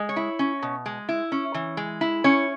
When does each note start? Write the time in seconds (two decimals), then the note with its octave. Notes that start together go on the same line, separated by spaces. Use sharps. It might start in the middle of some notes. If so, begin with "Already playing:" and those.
Already playing: G#3
0.09 C#5
0.16 E4
0.39 C#4
0.62 B2
0.86 G#3
1.09 E4
1.32 C#4
1.54 E3
1.77 G#3
2.01 E4
2.24 C#4 C#5